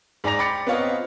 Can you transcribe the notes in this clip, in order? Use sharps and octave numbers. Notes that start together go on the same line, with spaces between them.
G#2 D5 G#5 A#5 A#6 F7
G5 B5 D6 A6 C#7
B3 C4 F4 C#5 D#5 F5